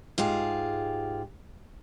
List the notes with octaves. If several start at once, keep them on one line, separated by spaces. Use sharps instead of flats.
G#2 F4 G4 G#4